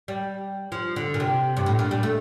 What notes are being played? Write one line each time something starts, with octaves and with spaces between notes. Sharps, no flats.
G3
F3
D3
A#2
C3
G2
A2
A#2
G3
A3